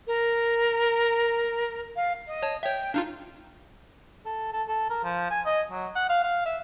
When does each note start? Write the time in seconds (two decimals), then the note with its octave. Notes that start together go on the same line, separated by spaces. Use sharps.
0.07 A#4
1.96 F5
2.27 D#5
2.43 C#5 A5
2.63 C#5 E5 G5
2.94 D4 D#4 F4 F5
4.26 A4
4.53 A4
4.68 A4
4.90 A#4
5.04 F3
5.31 G#5
5.46 D#5
5.71 F#3
5.96 F#5
6.10 F5
6.23 F5
6.46 E5